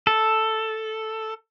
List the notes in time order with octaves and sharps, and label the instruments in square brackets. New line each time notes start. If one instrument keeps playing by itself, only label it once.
[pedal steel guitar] A4